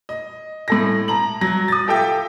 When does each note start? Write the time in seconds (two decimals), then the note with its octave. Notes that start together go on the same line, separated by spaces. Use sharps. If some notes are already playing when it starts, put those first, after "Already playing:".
0.09 D#5
0.68 A2 A4 A#6
1.08 A5 A#5 F#7
1.41 F#3 A#6
1.68 D#6 A6
1.87 F4 G4 A4 E5 G5